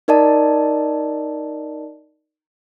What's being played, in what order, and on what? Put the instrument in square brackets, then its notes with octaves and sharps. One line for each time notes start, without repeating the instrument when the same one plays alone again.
[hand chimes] D#4 A#4 D5 D#5 A5